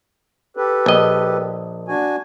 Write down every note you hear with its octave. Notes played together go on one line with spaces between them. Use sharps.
G4 A4 B4
A#1 D#5
D4 F#4 G#5